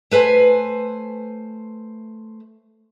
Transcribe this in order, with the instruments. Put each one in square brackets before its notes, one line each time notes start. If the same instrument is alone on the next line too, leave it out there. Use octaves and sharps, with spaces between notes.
[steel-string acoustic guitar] A3 B4 C5 G#5